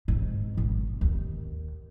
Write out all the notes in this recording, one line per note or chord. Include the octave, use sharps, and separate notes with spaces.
G#2
G#1
D#2